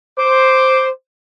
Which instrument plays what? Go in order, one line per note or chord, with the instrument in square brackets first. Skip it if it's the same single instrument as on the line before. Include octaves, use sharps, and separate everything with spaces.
[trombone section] C5 [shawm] D6